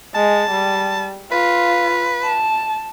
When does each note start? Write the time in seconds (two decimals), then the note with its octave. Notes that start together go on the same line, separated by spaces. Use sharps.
0.15 G#3 A5
0.51 G3
1.32 F4 B4
2.24 A5